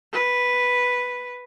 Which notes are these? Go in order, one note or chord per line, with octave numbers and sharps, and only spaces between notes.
B4